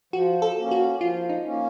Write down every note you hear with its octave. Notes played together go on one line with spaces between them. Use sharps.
F3 F#4
A4
A#3 C#4
F#4
F3 F4
D#4
A#3 C#4